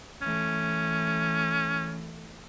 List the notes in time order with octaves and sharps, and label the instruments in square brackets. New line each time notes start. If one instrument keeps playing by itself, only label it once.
[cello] E3 A3 [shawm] C#4